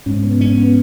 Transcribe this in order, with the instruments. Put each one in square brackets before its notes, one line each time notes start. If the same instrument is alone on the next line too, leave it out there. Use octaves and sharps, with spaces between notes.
[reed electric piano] G#2 [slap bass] C#4
[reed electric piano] B3
[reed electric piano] G#2 [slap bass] C#4
[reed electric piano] B3